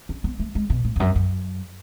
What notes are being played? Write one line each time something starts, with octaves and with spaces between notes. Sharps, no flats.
C#4
B3
A3
G#3
B2
A2
E2
F#2
F#2